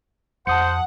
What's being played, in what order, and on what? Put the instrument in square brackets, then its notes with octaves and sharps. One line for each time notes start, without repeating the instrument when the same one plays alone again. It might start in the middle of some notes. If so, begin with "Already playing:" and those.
[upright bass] F2 [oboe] C5 [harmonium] F#5 [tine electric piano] A5 D#6 C#7